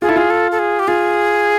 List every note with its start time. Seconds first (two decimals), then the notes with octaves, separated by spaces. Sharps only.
0.02 F4 G#4
0.09 E4 A4
0.16 F4 G#4
0.30 A4
0.52 A4
0.59 G#4
0.79 G4
0.88 F4 G#4